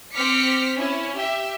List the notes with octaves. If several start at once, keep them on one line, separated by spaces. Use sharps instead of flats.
C4 D6 F6 B6 C#7
C#4 E4
G4 E5